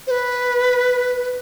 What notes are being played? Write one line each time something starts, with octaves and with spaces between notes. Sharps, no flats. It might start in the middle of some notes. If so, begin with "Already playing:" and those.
C5
B4